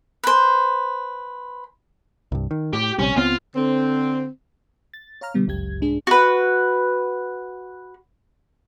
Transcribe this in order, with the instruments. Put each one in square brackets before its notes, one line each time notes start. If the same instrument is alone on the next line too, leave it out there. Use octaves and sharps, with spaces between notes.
[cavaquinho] B4 C5
[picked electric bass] C2 G2
D#3
[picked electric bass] A2 [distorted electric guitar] G4
[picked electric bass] A#1 C3 G3 [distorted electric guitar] C#4
[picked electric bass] C#2 B3 C4 [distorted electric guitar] F4
[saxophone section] D3 C4
[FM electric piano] A6
C#5 F5 A#5 F6
B2 D3 G3 B3
G1 C#2 F#2 G4 G#6
C2 G#2 D4 G#4
[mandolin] F#4 B4